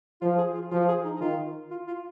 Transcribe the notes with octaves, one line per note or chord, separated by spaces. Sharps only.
F3 F4
G#4
F4
F3 F4
G#4
D#4
D#4
D#3 F4
F4
F4